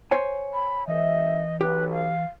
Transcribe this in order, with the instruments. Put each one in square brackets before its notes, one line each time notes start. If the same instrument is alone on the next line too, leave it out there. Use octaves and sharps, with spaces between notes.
[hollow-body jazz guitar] C5 C#5 G#5
[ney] B5
[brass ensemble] G#1 E5 [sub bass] E3 [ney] D#5
[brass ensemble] B1 [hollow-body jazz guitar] G4 [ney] B4
[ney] F5